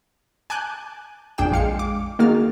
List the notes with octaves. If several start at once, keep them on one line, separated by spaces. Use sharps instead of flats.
G#5 A5 D6 F#6 G6
A#1 F2 D4 G#4 G5 E7
G#3 F5 C#7
D6
D#3 A#3 F#4 G#4 F6 A6